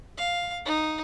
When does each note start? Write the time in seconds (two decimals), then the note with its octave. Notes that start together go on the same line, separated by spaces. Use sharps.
0.17 F5
0.65 D#4